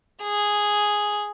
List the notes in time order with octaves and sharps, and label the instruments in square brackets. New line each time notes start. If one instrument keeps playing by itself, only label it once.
[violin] G#4